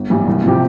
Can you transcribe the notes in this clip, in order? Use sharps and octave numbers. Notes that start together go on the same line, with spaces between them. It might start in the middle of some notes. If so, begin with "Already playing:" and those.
Already playing: G1
G2 E3 G3
C2
C3 F3 C4 G4